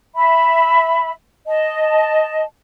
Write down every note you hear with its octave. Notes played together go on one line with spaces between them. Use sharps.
E5 B5
D#5 A5